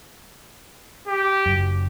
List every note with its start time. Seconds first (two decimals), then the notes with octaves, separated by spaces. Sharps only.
1.08 G4
1.46 F#1 F#2